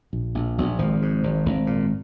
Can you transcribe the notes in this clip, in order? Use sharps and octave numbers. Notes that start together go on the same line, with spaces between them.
A#1
A#1
A#1
G#1 F3
G#2
G#1
G#1
A#2